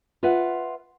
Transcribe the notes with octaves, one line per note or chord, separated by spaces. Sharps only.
F4 B4 E5 F#5